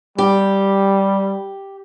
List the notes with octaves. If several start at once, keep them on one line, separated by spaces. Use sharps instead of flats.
G3 G4